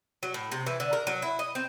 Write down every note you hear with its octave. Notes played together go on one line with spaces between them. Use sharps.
F#3
A2
C3
E3
D3
A#4
F#3
E4
D#5
C4